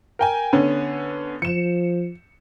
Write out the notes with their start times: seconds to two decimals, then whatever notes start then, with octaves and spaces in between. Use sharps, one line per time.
0.19 A#4 G5 G#5
0.53 D3 B3 C#4
1.42 F3 C#7 E7